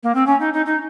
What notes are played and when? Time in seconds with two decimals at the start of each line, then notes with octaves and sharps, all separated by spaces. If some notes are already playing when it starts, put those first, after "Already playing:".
0.03 A#3
0.14 C4
0.26 C#4
0.40 D#4
0.53 D#4
0.65 D#4